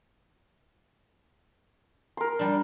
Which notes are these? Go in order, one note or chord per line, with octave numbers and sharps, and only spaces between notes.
A#4 C6
G3 D4